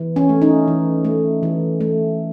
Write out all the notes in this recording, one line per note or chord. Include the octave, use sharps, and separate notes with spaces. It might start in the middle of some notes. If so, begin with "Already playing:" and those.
Already playing: E3
C#4
A3
D#4
E3
A3
E3
A3